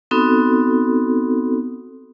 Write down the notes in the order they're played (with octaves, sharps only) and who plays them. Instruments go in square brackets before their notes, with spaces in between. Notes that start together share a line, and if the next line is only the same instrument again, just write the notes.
[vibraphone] B3 C4 D#4 F#4 A4